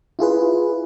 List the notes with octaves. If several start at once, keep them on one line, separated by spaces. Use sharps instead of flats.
E4 F4 G#4 B4